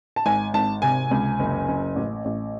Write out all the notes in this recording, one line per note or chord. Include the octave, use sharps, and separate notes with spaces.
A5
G#1 G#5
G#1 A5
C3 G#5
C#2
F#1
F#1
A1
A1